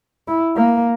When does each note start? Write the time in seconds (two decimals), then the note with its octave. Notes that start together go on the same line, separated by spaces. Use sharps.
0.28 E4
0.56 A#3